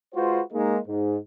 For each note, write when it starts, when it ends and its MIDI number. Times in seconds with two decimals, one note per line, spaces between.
0.14 0.40 56
0.14 0.40 65
0.14 0.40 66
0.14 0.40 71
0.14 0.40 72
0.53 0.78 56
0.53 0.78 58
0.53 0.78 63
0.87 1.17 44